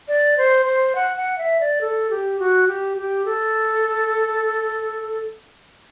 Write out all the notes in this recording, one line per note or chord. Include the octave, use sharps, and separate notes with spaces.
D5
C5
C5
F#5
F#5
E5
D5
A4
G4
F#4
G4
G4
A4